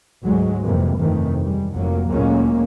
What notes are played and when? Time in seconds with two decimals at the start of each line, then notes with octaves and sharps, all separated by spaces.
0.24 D2 G#2 F#3 G#3
0.64 F2 C3 E3 A#3
0.98 G1 F2 C3 D#3 E3 A3
1.44 G3 G#3
1.73 F1 F#3 A#3
2.10 D2 A#2 F#3 G#3 A#3 C#4